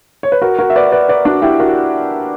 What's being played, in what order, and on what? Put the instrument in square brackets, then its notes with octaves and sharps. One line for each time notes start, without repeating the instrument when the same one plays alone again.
[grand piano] C#5
B4
F#4 A#4
F#4 A#4
E5
B4 D5
B4 D5
B4 D5
D4 F#4
E4 G4
F#4 A#4